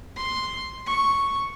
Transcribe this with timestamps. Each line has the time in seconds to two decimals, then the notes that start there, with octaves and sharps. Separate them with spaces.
0.16 C6
0.87 C#6